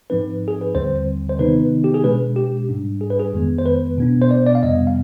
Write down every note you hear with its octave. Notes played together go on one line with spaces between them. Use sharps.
G#2 F3 C4 D#4 B4
G#4
B4
D#2 D3 G3 C4 C5
C5
C3 D#3 B3 D#4 B4
G4
G#4
B2 G#3 D4 B4
G4
G#2 G3 D4
G#4
B4
G#4
F2 D#3 G#3 B3
C5
B4
B2 B3 D4
C5
D5
D5
F5
F2 C3 G3 B3 D#5
F5